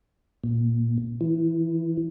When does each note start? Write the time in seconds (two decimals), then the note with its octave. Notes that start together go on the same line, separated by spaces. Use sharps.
0.44 A#2
1.21 E3